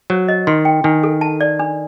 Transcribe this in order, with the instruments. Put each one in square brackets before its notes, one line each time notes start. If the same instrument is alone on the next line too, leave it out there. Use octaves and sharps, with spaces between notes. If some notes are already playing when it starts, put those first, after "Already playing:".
[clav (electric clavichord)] F#3 [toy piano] C5
[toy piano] D#5
[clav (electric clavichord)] D#3 [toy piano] C6
[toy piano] G5
[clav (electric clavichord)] D#3 [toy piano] D4
[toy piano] A4
A5
D5
D4